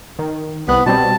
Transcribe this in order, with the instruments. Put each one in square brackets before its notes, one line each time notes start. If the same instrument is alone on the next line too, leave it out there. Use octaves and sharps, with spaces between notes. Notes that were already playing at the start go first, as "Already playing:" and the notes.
[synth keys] D#3
[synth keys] C2 F#6 [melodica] B3
[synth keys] B2 G3 C4 [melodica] A5